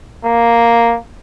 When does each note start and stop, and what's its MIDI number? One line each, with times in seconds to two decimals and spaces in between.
0.24 0.96 58